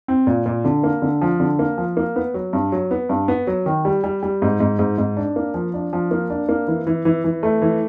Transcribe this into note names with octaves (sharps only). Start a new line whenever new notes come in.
C4
A#2
A#2
D3
A#3
D3
F3
D3
A#3
F3
A#3
B3
F#3
G2
F#3
B3
G2
B3
F#3
D#3
G3
G3
G3
G#2
G#2
G#2
G#2
D4
A#3
F3
D4
F3
A#3
D4
A#3
E3
E3
E3
E3
A3
E3